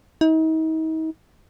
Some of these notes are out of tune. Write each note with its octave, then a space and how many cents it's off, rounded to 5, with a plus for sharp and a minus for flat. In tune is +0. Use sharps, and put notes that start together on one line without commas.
D#4 +40